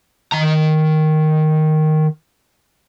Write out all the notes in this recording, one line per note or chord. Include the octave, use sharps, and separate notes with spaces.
D#3 A#5